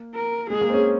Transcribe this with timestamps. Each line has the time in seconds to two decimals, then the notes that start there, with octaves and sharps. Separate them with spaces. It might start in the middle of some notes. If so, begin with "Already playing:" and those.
Already playing: A#3
0.15 A#4
0.50 G#3 G#4
0.61 A#3
0.70 C4
0.74 C#4